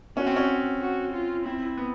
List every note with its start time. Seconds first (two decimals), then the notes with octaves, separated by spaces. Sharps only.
0.17 C#4 F#4
0.26 C4
0.36 C#4
0.81 F#4
1.13 F4
1.45 C4 E4
1.77 B3